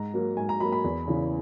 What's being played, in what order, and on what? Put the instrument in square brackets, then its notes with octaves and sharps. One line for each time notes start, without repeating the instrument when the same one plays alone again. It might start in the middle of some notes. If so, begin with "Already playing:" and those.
Already playing: [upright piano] G#2 A#5
F#3 A#3
G#2 G#5
A#5
F#3 A#3 B5
B5
E2
C#3 E3